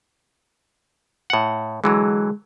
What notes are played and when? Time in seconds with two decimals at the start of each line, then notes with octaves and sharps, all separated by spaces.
1.30 A2 F#5
1.84 D3 E3 F#3 G#3